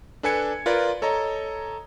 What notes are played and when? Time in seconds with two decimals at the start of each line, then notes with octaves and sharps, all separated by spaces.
0.23 D4 A4 B4 G#5 G#6 C#7
0.66 F4 A#4 B4 D5
1.02 A4 C#5 D#5 A#5